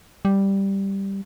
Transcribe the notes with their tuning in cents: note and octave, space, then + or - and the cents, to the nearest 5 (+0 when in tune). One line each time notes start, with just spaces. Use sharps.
G3 +0